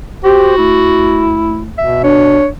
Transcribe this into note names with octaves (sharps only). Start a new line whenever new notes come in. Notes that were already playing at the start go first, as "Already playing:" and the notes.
F#4 G4 C5
D2 E4
B2 E5
D4 C#5